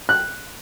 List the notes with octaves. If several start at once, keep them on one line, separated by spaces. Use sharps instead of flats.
F#6